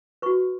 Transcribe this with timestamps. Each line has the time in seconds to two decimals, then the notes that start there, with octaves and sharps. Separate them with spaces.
0.22 F#4 B4 C#6